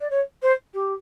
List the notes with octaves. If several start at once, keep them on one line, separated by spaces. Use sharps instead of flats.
D5
C#5
C5
G4